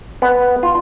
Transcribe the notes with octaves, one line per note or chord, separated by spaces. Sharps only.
B3
F4